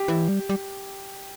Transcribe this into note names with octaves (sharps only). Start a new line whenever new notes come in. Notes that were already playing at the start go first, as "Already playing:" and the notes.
Already playing: G4
E3
G3
G3